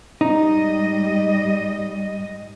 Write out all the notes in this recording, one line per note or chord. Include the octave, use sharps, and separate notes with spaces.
G#2 G3 D#4 D#5